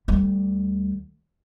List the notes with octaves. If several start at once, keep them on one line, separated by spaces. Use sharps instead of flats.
D2 G3